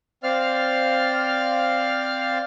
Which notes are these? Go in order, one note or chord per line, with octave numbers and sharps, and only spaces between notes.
C4 C5 D5 F5 F6